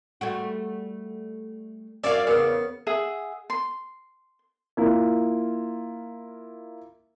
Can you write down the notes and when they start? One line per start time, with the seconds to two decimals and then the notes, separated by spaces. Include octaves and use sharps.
0.21 G3 A3 F#4
2.04 F#2 C#4 D5 E5 F5
2.27 E2 C#3 B3 A#4
2.86 G#4 E5 F#5
3.50 C6
4.77 A#3 E4 F4